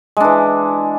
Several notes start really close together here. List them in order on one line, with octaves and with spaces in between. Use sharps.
G#3 D4 E3